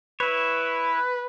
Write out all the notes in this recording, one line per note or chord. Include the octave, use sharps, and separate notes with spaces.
E4 B4 C#5